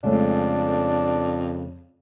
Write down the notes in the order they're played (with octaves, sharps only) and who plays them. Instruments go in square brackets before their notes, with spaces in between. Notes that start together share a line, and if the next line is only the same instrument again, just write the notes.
[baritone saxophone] F2 [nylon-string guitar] C#3 G#3 A3 [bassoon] D4